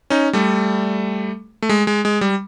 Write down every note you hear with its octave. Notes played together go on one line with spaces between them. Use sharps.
C#4 D#4
G3 A3
A3
G#3
G#3
G#3
G3